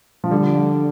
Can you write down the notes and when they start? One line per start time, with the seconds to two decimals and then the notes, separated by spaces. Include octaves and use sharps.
0.24 F3
0.31 D3 G3